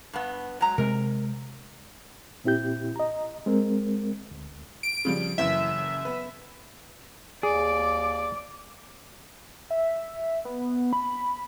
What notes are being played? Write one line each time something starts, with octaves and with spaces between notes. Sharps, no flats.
G2 B3
F#3 G#3 A#5
C3 G#3 A#4
A#2 C4 E4 G4 G6
D#5 A#5
G#3 C4 A#4
D2
D7
C#3 F3 G3
F#1 F#2 E3 E5
B3 B4
D#2 G#4 D5 D6
E5
B3
B5